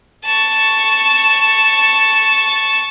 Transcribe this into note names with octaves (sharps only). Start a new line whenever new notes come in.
A5 C#6